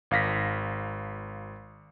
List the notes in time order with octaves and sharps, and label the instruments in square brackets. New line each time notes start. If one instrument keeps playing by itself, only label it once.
[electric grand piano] G#1 F5 A#6 B6